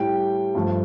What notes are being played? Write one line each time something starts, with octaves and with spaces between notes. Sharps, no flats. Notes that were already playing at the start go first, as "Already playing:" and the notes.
Already playing: A2 G3 G5
G2 F3 A3